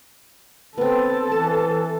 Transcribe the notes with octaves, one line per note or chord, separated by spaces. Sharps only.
B3 C4 A4
E3 A5